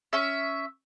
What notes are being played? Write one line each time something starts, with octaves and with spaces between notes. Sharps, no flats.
C#4 E5